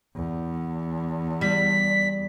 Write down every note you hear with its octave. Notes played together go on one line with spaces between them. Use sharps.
E2
G3 B6